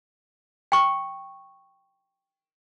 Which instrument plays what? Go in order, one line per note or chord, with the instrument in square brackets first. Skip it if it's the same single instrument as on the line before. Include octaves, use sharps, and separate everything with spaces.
[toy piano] G5 C#6